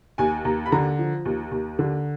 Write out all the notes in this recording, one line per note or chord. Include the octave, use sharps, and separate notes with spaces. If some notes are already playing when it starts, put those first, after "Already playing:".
D#2 G#5
D#2 A#5
B5
D3 A#5
F3
D#2
D#2
D3